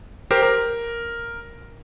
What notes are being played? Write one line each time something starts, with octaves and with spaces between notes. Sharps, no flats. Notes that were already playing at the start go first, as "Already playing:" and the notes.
G4 A#4 C5
A#4